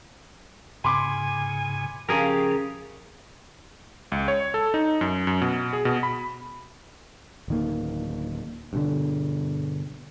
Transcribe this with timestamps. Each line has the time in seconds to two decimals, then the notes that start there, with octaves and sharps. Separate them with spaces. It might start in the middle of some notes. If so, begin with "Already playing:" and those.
0.85 G#2 C#3 G#5 B5 C6 D6
2.09 C#3 F3 G4 G#4 A#4
4.12 C#2
4.28 C#5
4.54 A4
4.74 D#4
5.01 F#2
5.27 F#2
5.42 B2
5.73 G#4
5.85 B2
6.03 B5
7.48 D1 D#3 A#3
8.73 G2 B2 D3